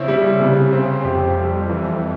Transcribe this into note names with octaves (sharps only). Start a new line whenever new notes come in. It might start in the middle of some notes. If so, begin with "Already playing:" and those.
Already playing: C#3 C4 E4
G3
C3
C4
F2 G4
G3
E3